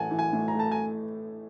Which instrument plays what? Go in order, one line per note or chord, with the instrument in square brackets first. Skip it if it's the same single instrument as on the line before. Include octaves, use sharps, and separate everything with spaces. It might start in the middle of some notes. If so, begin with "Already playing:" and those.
Already playing: [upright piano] A1 A2 A3 [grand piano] F#5 G#5 A5
[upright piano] E3
[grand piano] G#5
[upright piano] A2
[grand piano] A#5
[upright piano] A3 [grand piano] A5
[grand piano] G#5